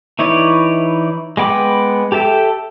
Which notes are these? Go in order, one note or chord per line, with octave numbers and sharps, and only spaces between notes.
E3 D#4 E4 C#5 D5
G#3 B3 G5 B5 D6
G4 A4 E5 G5